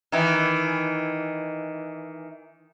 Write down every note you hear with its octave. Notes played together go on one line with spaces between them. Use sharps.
D#3 E3